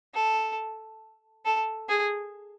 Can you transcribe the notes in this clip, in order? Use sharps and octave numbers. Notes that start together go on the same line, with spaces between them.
A4
A4
G#4